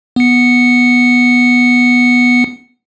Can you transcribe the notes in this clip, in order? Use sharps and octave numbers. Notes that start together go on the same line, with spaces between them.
B3 C#7